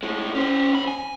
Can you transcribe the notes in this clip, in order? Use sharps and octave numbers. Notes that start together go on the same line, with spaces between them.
A2 G#3
C#4 C5
E2 B5
G#5